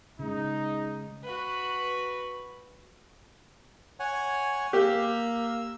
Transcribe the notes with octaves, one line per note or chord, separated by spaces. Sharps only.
C#3 G#3 D#4
F#4 B4
C#5 F#5 G#5
A#3 G4 E6